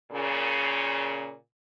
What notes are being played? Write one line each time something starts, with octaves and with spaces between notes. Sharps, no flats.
A#2 C#3